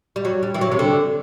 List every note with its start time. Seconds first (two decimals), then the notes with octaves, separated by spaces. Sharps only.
0.16 G3
0.25 F#3
0.43 G3
0.54 E3
0.61 F#3
0.72 C3
0.79 D3